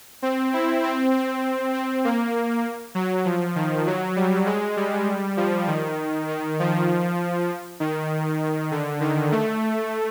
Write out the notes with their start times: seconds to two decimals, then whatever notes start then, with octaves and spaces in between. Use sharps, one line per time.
0.22 C4
0.54 E4
0.83 C4
1.14 C4
1.74 C4
2.05 A#3
2.95 F#3
3.25 F3
3.56 D#3
3.87 F#3
4.16 G3
4.46 G#3
4.76 G3
5.37 F3
5.67 D#3
6.28 D#3
6.59 F3
7.80 D#3
8.71 D3
9.00 D#3
9.32 A3